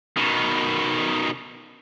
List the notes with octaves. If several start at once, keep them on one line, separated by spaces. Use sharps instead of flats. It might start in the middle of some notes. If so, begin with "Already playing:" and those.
B2 D#3